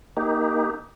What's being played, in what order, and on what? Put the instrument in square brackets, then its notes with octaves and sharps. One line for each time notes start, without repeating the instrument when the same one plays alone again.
[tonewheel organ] A#3 D#4 G4